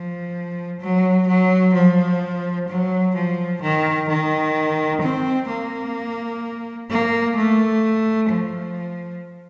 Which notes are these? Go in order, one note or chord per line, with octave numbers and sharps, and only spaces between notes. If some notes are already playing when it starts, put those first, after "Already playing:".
Already playing: F3
F#3
F#3
F3
F#3
F3
D#3
D#3
C4
A#3
A#3
A3
F3